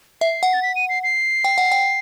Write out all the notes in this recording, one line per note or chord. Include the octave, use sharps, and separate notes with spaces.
E5 C7
F#5
A6
B6
D#7
C7
C7
G5
F#5
G5